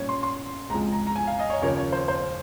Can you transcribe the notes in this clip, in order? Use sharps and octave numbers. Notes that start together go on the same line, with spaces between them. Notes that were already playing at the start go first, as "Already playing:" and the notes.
Already playing: A#2 G3 C#4 C#5
C6
C6
C#2 C3 F3 G#3 A#5
A#5
A#5
G#5
F5
D#5
C#5
D#2 C#3 F3 A#3 C#5
C#5
C5
C5